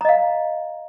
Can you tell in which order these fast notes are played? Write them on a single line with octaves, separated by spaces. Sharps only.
A#5 D#5 F5